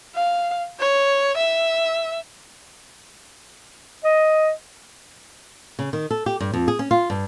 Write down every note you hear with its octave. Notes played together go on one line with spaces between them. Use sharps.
F5
C#5
E5
D#5
C#3
D#3
A4
G4
G2
F2
G#4
C#4
F4
G2